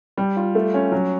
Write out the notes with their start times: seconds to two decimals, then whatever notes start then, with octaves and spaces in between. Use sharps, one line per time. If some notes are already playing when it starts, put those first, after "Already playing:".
0.17 G3
0.36 F4
0.55 A3
0.74 C#4
0.92 F#3